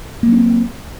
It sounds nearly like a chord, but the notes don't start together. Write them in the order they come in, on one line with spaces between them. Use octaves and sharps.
A#3 F#3 C#4 C4